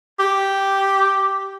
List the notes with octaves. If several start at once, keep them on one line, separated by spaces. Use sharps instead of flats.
G4